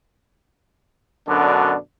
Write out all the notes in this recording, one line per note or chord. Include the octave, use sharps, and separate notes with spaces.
F#2 B2 D3 D4